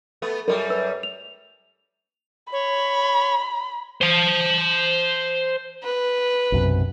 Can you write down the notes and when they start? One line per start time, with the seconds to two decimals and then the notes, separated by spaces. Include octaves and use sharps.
0.22 A3 B3
0.48 F#2 G3 A#4
0.70 B4 E6
1.03 F7
2.52 C#5 B5
4.01 C5 A5
5.83 B4
6.52 B1 F#2 C3